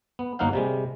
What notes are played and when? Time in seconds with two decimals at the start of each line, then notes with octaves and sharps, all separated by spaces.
0.19 B3
0.39 G1 F#3 A#3 D#4 F5 F#5
0.53 C3 G3 G#3